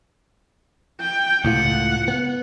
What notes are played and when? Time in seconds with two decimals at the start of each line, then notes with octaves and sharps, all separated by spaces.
1.00 G5
1.45 C#2 A2 F4 F#5
2.08 B3